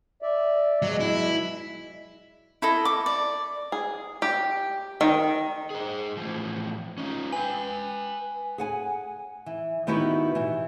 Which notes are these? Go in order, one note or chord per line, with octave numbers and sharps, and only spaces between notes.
D5 E5
B2 F#3 G#3
E4
E4 A4 D#5
D6
D5
G#4
G4
D#3
G#4 C5
A2 E3 F3
C#4 D#4 F4
B4 G5 G#5
G#4 F#5 G#5
E3
D#3 B3 D#4 E4 F#4 G4
B2 E3